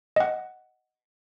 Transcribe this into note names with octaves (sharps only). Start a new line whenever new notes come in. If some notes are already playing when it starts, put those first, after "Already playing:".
D#5 F#5